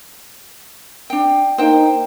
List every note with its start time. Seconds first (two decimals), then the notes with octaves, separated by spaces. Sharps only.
1.10 D4 G5
1.58 A#3 D#4 C5 G5